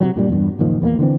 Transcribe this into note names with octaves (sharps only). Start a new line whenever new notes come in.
C3 D#3 F#3
G2 A#2 G3
E2 G2
F#1 A#2 D#3 F3
E2 F3 A#3
D3 E3 B3 C4